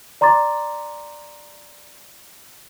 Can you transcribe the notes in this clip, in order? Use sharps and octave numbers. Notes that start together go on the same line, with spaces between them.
D5 A#5 C6 D6 A6